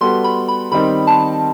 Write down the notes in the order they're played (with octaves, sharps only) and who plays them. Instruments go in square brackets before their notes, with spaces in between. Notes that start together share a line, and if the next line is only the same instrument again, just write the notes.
[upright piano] G3 B3 F#4 A4 [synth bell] C6
[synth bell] B5
B5
[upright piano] D#3 G3 C4 D#4 [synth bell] B5
[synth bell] A5